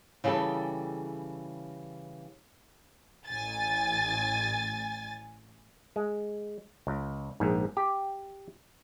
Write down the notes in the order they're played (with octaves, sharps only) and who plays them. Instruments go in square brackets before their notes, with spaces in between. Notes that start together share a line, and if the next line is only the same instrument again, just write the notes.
[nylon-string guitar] C#3 E3 G3 G4 A4
[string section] A1 G#5 A6
[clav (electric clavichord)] G#3
C#2
A#1 G#2
G4